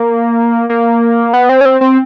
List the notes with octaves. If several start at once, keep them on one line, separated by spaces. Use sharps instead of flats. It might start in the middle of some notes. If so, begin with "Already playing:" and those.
Already playing: A#3
A#3
B3
C4
C#4
C4
C4